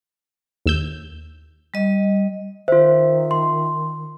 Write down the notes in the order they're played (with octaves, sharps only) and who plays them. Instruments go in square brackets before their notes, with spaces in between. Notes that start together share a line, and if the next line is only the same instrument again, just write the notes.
[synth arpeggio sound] D#2 E6 G6
[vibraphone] G3 D#5
[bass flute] D#3 [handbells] F4 E5 [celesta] C5
[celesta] C6